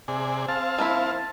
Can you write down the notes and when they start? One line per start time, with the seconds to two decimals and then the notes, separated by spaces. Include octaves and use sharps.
0.08 C3 G#4 D5
0.48 C4 F5 A5
0.78 F3 A#3 E4